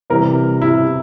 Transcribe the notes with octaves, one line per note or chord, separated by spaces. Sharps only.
C3 E3 G3 A#4
E4